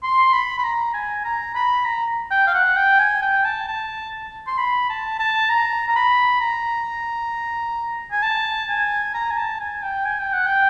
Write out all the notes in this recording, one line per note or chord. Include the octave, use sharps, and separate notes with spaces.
C6
B5
B5
A#5
G#5
A#5
B5
A#5
G5
F5
F#5
G5
G#5
G5
A5
A5
C6
B5
A5
A5
A#5
A#5
B5
A#5
G#5
A5
G#5
A#5
G#5
A5
G#5
G5
G#5
G5
F#5
G5